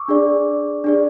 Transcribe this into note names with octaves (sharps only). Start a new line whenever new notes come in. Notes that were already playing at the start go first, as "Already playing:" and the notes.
Already playing: C#6 D6 E6
D4 G#4 D5
D4 G#4 D5